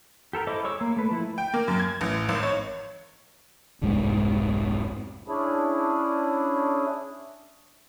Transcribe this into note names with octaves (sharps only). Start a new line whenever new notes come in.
G4 A4 A#4 G5
E4 A4 C5 D#5 D6
G#3 C#5 C#6 D6 E6
A#3
A3 B4
F3 E4
G5
A#3
F#2
G#6
A1
G#1
C#5
F1 C2 G#2 G#3
C#4 D4 E4 G#4